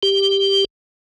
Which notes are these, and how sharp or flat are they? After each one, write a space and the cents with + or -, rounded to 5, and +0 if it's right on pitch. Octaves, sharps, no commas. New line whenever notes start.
G4 +5